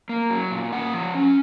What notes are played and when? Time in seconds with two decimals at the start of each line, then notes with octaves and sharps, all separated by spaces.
0.09 A#3
0.30 F#3
0.51 A#2
0.72 A#3 F#5
0.94 F3
1.14 C#4